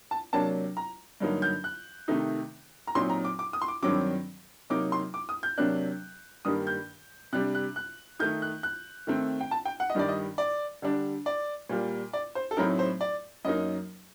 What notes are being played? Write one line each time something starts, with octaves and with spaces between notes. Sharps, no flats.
A5
C3 F#3 A#3 D4 A5
A#5
G2 D3 F#3 A#3 D#4
G6
F#6
C3 D#3 A3 D#4
A#5
A#2 F#3 C4 D#4 C6
A#5
D6
D6
D#6
C6
D6
G2 D#3 F#3 C4 D6
C3 F#3 A#3 D#4 D6
C6
D6
D#6
G6
C3 F#3 A#3 D4 F#6
G2 D#3 G3 A#3 D#6
G6
C3 G3 D4 F#6
F#6
F#6
D#3 A3 D#4 G6
F#6
F#6
D#3 A3 C4
G5
A5
G5
F#5
D#5
G2 D#3 G3 D5
D#5
D5
D3 G3 D4
D5
A#2 G3 A#3
D5
C5
A4
A2 F#3 A3 C4 D#4 A#4
C5
D5
F#2 F#3 A#3 D#4 D#5